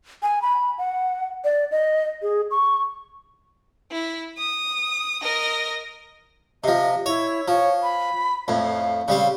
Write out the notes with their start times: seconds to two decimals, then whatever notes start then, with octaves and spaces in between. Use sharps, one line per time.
0.23 G#5
0.42 B5
0.78 F#5
1.44 D5
1.71 D#5
2.22 G#4
2.51 C#6
3.91 E4
4.38 D#6
5.22 A#4 D#5
6.64 C3 F3 D#5
7.06 E4 C#5
7.48 F3 C#5
7.83 B5
8.48 F2 A2 F5
9.08 C#3 G3 C4 F5